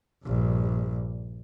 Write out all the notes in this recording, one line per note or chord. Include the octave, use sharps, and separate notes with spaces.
A#1 G2